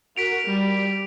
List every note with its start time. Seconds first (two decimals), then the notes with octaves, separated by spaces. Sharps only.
0.17 F#4 A#4 B6 D7 F7
0.47 G3